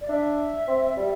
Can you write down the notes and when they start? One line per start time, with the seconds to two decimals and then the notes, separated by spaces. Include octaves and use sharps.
0.01 D5
0.09 D4 E5
0.67 C4
0.97 G3